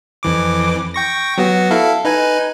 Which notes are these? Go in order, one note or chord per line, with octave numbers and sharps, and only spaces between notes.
F2 E3 D6
G5 C#6 A#6
F#3 B3 F#4
E4 A4 F5
D#4 B4 G#5